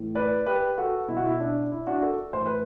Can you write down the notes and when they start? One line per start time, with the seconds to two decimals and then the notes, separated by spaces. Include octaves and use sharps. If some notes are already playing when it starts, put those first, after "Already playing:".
Already playing: A2 E3
0.15 B4 D5
0.46 G4 B4
0.78 F#4 A4
1.08 B2 E4
1.17 F#4
1.25 E4
1.40 D4
1.72 E4
1.87 D4 F#4
2.02 F#4 A4
2.33 A2 E3 C5
2.46 B4